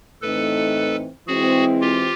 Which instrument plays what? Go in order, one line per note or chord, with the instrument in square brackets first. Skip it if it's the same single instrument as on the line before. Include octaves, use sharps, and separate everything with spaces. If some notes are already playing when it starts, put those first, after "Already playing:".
[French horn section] A2 E3 A3 C4 D#4 [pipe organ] A4 B4
[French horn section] E3 G#3 C4 E4 [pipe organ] F#4 G#4
[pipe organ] F4 G4